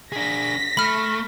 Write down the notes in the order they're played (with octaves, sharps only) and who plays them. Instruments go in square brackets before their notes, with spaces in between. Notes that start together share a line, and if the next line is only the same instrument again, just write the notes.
[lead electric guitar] D4 G#4 [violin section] A#6 B6
[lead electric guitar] A3 [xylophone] B5 F6